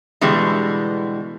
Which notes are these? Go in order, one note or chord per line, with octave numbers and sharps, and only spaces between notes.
B2 D3 E3 G3 G#3